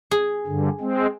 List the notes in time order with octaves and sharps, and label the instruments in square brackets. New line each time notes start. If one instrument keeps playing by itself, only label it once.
[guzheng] G#4
[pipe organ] G2 D3
G#3 C4